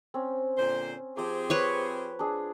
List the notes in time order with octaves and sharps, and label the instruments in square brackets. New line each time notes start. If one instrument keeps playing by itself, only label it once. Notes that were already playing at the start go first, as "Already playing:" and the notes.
[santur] C4 C#4
[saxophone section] A#2 D3 C5
[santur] F3 D6 [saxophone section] C4 G4 G#4
[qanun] B4 C#5 C#6
[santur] D4 G#4